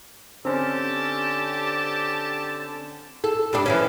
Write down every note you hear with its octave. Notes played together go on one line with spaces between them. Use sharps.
D3 C4 C#4 G4 A5
A4
G2 G3 D4
E3 F3 C#4